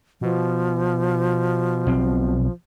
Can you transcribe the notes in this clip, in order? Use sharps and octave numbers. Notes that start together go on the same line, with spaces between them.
B2 F3
B1 C4